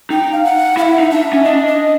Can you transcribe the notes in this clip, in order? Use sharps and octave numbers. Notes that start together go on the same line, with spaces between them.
D#4 G5
F5
F#5
E4 E5 F5
D#4
D4 E5
C#4
D4 D#5
D#5